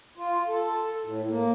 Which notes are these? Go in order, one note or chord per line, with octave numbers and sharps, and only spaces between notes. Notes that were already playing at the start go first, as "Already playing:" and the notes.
F4
A4
A2
A#3